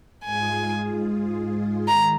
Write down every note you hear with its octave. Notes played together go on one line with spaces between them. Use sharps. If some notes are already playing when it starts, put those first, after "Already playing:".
G#2 G#3 F4 G#4 G#5
D#3 G#3 A#5